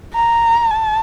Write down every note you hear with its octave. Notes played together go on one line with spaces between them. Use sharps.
A#5
A5